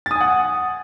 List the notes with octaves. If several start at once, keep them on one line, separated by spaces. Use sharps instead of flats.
F#5 G#5 D#6 A6